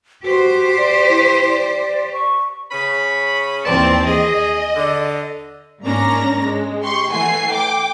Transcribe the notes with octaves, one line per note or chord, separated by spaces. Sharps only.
F#4 G4 C5
D5
E4
D5
C#6
C#3 C#4 B5
D#2 E3 C4 D5 A5
G#4 D#5
D3
G#2 A#3 C#4 D4 A#5 A#6
G#3
G4 C6 C#6
E3 A3 F#5 G#5 C7
G5 D6